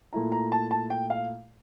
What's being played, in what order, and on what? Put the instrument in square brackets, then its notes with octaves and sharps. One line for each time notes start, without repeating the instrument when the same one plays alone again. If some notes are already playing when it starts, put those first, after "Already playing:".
[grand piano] A#2 A3 E4 A#5
A#5
A5
A5
G5
F5